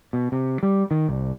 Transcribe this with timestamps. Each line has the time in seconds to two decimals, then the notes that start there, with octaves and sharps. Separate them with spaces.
0.13 B2
0.32 C3
0.63 G3
0.91 D#3
1.09 C2